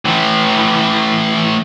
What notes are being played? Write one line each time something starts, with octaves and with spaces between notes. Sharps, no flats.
A2 E3